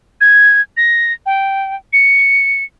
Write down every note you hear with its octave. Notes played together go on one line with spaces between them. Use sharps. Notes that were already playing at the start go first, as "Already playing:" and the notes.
G#6
A#6
G5
C#7